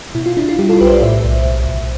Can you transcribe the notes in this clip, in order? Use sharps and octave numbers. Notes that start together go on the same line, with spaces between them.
B2 E4
F4
D4 E4
F4
G3 E4 G4
F4 A4
B1 G4 B4
C5
B4 D5
A2 C5 E5
B1
B1
B1